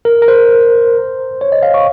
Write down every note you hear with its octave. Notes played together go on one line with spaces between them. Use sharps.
A#4
A#4
C5
C#5
D#5
F5
C#6